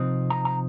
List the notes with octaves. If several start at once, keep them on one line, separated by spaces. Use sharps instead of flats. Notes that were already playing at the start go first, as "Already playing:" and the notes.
Already playing: C3 F3 C4 D#4
A#5
A#5